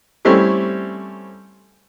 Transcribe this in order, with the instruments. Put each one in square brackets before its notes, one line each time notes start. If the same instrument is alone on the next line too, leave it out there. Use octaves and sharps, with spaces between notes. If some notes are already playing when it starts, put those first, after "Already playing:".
[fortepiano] G3 A3 C4 C#4 E4 G4